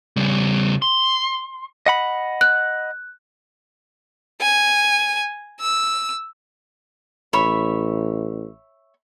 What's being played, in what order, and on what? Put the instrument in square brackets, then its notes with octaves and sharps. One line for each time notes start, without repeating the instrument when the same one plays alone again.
[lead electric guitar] C#3 G3
C6
[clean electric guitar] D#5 F#5 B5
[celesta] F#6
[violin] G#5
E6
[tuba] A1 [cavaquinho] C#5 E5 B5